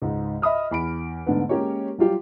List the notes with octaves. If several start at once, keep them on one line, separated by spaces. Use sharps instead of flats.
C#2 G#2
D#5 E5 B5 D#6 F6
E2 B5 D7
G#2 D3 A3 B3
G#3 A#3 C#4 G4 A#4 C#5
F#3 G3 F4 G4